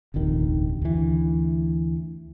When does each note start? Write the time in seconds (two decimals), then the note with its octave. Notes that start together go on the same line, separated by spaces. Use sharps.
0.14 F1 A#1 D#2 D#3
0.81 D2 E3